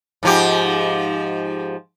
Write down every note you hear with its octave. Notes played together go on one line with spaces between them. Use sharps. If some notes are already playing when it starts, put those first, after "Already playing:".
G#2 F3 G4